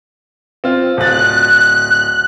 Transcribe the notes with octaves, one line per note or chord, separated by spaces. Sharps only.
C4 F4
D1 F#6 A6